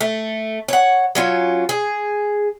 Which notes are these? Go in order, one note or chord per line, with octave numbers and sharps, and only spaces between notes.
A3
C#5 F#5
F#3 C#4 F4
G#4